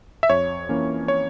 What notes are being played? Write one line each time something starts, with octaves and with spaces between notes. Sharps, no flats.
E5
F2 C#5
E3 A#3 C#4
C#5